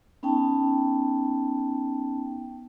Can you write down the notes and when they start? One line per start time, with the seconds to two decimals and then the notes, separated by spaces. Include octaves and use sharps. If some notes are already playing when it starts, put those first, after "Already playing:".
0.23 B3 C#4 D#4 G5 A5